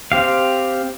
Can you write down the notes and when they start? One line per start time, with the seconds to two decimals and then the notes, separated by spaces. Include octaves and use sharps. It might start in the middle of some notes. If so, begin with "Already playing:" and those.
0.12 C4 G4 F5